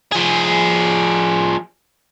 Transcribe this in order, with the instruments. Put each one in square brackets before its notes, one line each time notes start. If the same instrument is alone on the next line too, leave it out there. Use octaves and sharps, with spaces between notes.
[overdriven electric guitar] F3 G#4